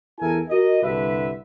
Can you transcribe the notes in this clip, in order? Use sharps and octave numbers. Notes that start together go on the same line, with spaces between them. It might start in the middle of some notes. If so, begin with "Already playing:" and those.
E2 E4 A4 A#4 G#5
F#4 A#4 D#5
C2 G2 D3 B4 E5